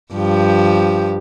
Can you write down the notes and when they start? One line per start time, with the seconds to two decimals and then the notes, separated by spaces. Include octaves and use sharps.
0.13 G2 F3 G4